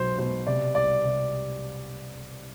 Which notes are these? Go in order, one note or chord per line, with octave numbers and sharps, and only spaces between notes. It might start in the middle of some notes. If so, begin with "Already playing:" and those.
Already playing: B1 B2 F#3 C5
B2 C5
C3 D5
C2 D5
C3